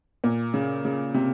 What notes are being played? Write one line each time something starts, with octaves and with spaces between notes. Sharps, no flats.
A#2
C#3
C#3
C3